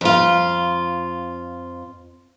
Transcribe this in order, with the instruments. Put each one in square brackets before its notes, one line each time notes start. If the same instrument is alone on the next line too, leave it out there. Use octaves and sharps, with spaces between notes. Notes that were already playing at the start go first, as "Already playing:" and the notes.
[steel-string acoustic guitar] F2 F4